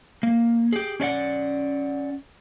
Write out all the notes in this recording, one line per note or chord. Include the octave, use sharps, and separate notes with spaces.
A#3
G4 G#4
C#4 D4 D5 F#5